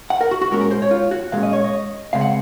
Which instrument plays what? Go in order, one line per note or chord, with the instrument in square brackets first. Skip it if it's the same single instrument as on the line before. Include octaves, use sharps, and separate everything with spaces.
[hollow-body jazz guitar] F#5
A#4
F#4
F#4
A#2 G#3 C#4 A#4
A#4
C5
C#5
F4
F#4
A#2 G#3 C#4 F5
D#5
C#5
D#5
C#2 C#3 G#3 C4 F5
F#5